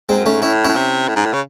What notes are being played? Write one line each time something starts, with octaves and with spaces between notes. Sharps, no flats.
G#2 G#3 C4
F#2
G#2 A3 C#4
A2 C#4 E4
A2 C#4 E4
C3
A2
G#2
A2
C#3